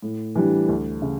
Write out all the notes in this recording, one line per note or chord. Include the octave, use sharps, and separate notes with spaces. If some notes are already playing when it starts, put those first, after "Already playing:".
A2
E3 G3 D4 G4
D2
C#3